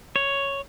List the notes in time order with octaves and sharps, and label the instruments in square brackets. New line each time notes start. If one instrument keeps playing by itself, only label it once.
[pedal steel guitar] C#5